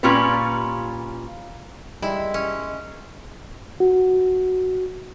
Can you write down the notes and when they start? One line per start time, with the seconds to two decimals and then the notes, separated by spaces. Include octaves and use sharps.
0.03 A#2 C#4 F4 G4 B4
2.02 D#3 G3 G#3 E4
2.34 C#4
3.80 F#4